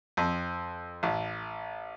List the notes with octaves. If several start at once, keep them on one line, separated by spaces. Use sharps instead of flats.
F2
A1